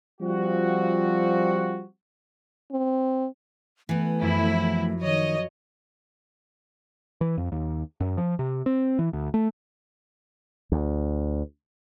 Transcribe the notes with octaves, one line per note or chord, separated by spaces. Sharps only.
F3 G3 C4 F4 F#4
C4
E3 A3 B3
F#2 F3 E4 B5
D#3 C#5 D#5
E3
F2
D#2
F#2
F3
C3
C4
E3
D2
A3
D2